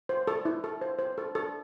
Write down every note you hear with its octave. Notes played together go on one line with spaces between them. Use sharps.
C5
A4
E4
A4
C5
C5
A4
A4